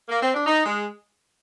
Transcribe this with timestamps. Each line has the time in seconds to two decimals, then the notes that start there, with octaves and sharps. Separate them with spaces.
0.09 A#3
0.21 C4
0.34 D4
0.46 D#4
0.65 G#3